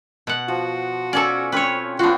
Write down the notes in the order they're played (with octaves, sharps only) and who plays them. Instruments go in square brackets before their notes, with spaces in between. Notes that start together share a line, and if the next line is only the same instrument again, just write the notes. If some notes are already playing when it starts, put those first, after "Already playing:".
[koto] B2 F#5
[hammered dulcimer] F3 [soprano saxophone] F#4
[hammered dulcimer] C#4 G#5 C#6 [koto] A4 D5
[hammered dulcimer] C4 C#4 [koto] B4 C#5
[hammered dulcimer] B3 G5 [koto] D4 F#4 [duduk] F4 [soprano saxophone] F5